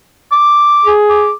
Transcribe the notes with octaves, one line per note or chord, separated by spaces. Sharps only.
D6
G#4
D6